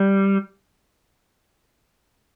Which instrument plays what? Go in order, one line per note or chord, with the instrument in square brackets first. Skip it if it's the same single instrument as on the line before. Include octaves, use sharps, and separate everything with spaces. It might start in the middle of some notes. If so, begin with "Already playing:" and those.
Already playing: [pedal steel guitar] G3